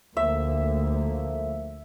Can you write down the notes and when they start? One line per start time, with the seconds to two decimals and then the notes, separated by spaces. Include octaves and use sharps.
0.17 D2 F3 A3 A#3 E5